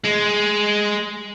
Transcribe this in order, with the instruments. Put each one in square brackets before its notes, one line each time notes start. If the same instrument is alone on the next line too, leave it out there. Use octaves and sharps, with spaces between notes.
[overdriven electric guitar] G#3